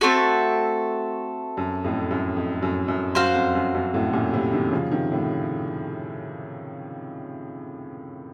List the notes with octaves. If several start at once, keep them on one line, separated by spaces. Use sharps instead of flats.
A3 C4 F#4 A4
F#2
F2 A2
F#2
F2
F#2
F#2
F#2 F#4 C5 F5
F2
F#2
F#2
F2 A2
F#2 A#2
A2 C3
C3 D#3
C#3 F3
C3 D#3
A2 C3